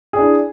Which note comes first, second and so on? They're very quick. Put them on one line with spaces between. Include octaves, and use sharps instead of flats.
G#4 D5 D4 E4